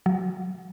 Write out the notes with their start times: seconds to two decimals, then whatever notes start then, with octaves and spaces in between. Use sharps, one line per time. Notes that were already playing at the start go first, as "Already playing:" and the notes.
0.06 F#3